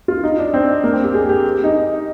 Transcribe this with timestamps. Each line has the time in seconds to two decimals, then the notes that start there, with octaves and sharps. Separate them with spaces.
0.08 F4
0.24 D#4
0.38 D4
0.54 C4
0.84 A#3
0.93 C4
1.04 G4
1.14 G#4
1.29 G4
1.64 D#4